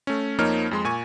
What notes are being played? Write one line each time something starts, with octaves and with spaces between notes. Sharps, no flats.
A3 C#4
F2 F3 A#3 D#4 C#5 F6
F2 G#3 C6
A#2 G#5 C#6